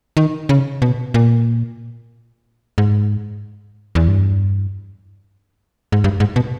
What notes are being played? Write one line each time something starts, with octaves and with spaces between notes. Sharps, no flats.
D#3
C#3
B2
A#2
G#2
E2
G2
G#2
G2
G#2
B2